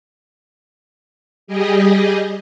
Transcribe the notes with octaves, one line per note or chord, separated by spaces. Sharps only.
G3 G4 G#4 D#5